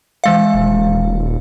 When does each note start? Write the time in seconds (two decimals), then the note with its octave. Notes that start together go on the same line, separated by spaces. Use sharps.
0.24 E3 G#3 F5
0.54 D#1